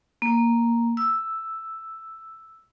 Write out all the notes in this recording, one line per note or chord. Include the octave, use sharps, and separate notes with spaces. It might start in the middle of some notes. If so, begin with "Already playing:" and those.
A#3
E6